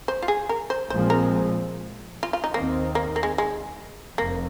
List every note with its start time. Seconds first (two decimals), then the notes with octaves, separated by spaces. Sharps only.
0.08 C5
0.23 F4
0.28 G#4
0.49 A#4
0.70 C5
0.90 A#1 A#2 F3 G#3 C4 C5
1.10 A#4
2.23 F4
2.33 F4
2.44 D#4
2.53 D#2 D#3 A#3 C4
2.95 A#3
3.16 A#3
3.23 G#3
3.38 G#3
4.18 F1 F2 C3 A#3